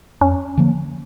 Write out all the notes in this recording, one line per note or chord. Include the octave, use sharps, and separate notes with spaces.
F2 C#4
D3 F3 A#3